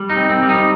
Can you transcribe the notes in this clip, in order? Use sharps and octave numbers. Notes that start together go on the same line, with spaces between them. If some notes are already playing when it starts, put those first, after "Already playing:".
Already playing: G3
D#4
C4
C4
G3
D#4